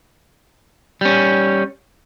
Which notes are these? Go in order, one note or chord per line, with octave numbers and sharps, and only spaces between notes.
G3 C#4